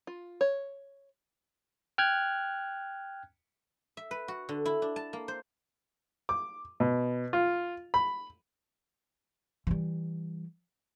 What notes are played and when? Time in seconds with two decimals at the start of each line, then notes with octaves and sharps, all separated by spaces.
0.07 F4
0.41 C#5
1.98 G5 F6 F#6 G#6
3.97 E5
4.11 B4
4.28 F#4
4.49 D3
4.65 E4
4.82 D4
4.96 A5
5.13 A#3
5.28 C5
6.29 D6
6.80 B2
7.33 F4
7.94 B5
9.67 E3 G3